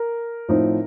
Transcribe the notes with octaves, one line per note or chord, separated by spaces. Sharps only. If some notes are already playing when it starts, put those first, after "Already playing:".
Already playing: A#4
A2 F3 C4 D#4